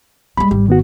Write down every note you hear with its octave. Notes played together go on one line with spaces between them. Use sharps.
G3 G#3 B5
G#1 G3
D#3 B3 F#4